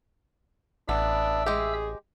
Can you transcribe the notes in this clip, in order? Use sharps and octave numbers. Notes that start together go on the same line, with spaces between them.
A1 B3 D4 E5 E6
G#3 G4 G#4